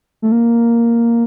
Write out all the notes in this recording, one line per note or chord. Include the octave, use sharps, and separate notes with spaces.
A3
A#3